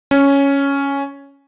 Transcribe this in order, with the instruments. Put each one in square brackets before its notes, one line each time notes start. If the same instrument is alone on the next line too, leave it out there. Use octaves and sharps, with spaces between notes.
[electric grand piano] C#4